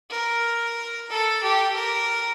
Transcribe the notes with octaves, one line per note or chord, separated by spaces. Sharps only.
A#4
A4
G4
A#4